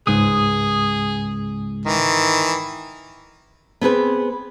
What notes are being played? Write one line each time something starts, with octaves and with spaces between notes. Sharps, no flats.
C#2 G#2 G#4 D#6
D#3 E3
B3 C4 G#4 B4